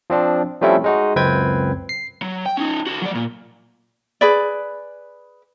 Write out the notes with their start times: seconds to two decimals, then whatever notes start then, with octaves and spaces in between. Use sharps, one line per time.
0.10 F3 C4 D4
0.62 F3 G3 A3 C4 C#4 E4
0.84 G#3 D#4 F#4
1.16 C#2 F#2 C4 B4 G5 G#6
1.89 C7
2.22 F#3
2.46 G5
2.57 C#4 D#4
2.87 F#4 A4
3.02 F#3 D5
3.15 A#2
4.21 G#4 B4 D5